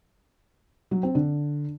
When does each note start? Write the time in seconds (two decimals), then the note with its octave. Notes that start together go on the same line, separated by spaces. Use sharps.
0.91 F#3
1.03 C4
1.15 D3